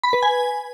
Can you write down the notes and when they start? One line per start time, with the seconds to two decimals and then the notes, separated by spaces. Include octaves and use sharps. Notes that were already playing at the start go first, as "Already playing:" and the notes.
0.03 B5
0.13 B4
0.23 G#5